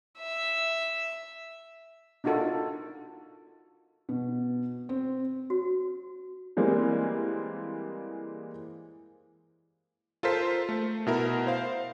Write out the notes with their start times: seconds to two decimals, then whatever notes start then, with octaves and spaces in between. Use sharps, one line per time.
0.19 E5
2.24 D4 D#4 F4 F#4 A4 A#4
4.09 B2
4.89 C4
5.50 F#4
6.57 E3 G3 G#3 A#3 C4
10.23 F4 A4 A#4 C5 B6
10.69 A3
11.07 B2 E4 A#4
11.47 C5 F5